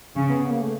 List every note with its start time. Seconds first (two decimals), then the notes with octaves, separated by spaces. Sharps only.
0.16 C#3
0.28 B3
0.39 B3
0.50 A#3
0.61 A3